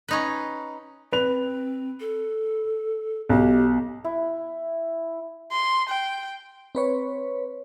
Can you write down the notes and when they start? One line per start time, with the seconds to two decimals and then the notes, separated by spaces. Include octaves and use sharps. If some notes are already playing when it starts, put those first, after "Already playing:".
0.08 C#4 D#4 B4
1.12 C4 B4 F7
2.00 A4
3.29 B1 G4
4.04 E4
5.51 C6
5.89 G5
6.75 C4 B4 C#5